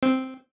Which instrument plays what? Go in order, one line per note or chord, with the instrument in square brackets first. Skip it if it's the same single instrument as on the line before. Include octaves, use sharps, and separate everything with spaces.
[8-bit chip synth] C4